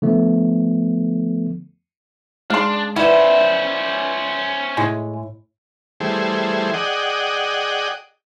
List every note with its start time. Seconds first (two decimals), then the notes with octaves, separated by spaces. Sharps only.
0.02 D3 F3 A3 B3
2.50 G#3 D4 G#4 F5 C6
2.96 C#4 E4 B4 C5 D5 F#5
4.77 A2 G#3
6.00 E3 G3 A3 G#4 C5
6.74 G#4 D5 D#5 F#5 G5